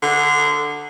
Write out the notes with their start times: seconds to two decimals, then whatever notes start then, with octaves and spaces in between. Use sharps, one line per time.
0.02 D3